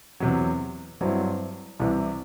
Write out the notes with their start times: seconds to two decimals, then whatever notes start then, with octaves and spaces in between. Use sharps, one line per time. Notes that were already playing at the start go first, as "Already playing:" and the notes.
0.20 E2 C3 F#3
1.01 G2 F#3 C4 E4
1.80 C2 C3 E3